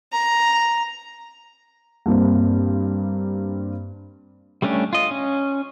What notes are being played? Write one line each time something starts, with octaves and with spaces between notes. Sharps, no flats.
A#5
G2 A#3 C4
G3 A3 C#4 D4 G4
F4 D#5
C#4